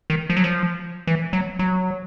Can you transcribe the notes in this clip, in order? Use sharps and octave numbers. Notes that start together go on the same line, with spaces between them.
D#3
F3
F#3
F3
E3
F#3
F#3